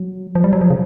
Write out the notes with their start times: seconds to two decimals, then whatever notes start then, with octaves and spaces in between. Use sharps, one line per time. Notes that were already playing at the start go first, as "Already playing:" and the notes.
Already playing: F#3
0.35 F3
0.44 G3
0.53 F#3
0.61 F3
0.70 C#3